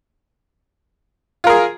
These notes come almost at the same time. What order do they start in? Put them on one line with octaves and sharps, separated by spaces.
F4 A#4 G#4